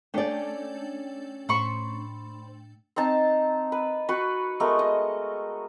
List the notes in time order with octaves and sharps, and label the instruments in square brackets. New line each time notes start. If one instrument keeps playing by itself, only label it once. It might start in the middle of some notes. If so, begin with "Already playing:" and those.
[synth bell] A3 D4 G5 [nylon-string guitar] C#4 D5
[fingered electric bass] A2 [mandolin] C5 B5 C#6
[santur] C4 D#4 A5 A#5
B4
F#4 B4 C#6
G#3 A3 B3 A#4
D#5